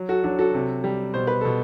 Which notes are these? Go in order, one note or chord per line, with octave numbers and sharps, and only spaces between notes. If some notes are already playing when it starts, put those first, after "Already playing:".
Already playing: F#3
F#4 A4
F#3 D4 F#4
F#4 A4
C3
G3
B2 C5
B4
B2 A4